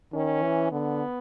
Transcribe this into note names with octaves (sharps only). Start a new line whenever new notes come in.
D#3 C#4
E3
D3 B3